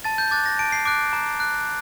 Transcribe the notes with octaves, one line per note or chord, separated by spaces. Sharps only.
A5 A6
G6
D6 F#6 A6
A#6
A5 D7
C7
D6 F#6 D7
A#5
F#6